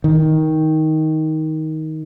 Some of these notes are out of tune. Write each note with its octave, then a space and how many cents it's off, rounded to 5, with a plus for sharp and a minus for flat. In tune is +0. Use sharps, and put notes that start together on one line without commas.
D#3 +15